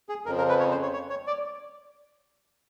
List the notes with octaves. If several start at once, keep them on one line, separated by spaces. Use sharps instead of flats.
G#4
F2 C#3 F3 A#4
A#4
B4
C#5
C5
C#5
C#5
C#5
D5